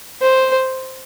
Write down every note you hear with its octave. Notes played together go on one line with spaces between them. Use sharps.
C5